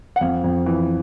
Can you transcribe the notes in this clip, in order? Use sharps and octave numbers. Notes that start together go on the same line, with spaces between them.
F#5
F2 F5
F2
E3